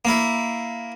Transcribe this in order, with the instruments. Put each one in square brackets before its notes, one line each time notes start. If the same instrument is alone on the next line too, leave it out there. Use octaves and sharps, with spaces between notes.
[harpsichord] A#3 E4